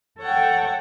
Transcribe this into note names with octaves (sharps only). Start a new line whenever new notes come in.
A4 C#5 F#5 G5